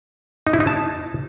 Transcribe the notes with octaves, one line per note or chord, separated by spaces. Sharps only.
D#4
E4
D#4
A5